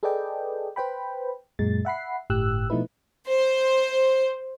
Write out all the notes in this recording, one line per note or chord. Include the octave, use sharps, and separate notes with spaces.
G#4 A4 B4 D5 D#5 G5
B4 C5 G5 B5
F#2 A#2 G#3 A6
E5 F#5 B5 C7
G1 A2 G4 E6 F#6
B2 F3 A3 D#4 E4 B4
C5